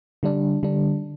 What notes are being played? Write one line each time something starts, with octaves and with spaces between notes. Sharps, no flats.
D3 G3 D4
D3 G3 D4